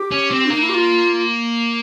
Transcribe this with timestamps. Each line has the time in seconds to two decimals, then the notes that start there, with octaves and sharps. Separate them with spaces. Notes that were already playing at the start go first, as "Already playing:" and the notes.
Already playing: G4
0.11 C#4
0.30 C4
0.45 D4
0.50 A#3 D#4
0.61 E4
0.69 G4
0.74 F4